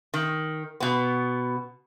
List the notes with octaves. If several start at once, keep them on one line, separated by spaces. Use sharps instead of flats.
D#3
B2 B3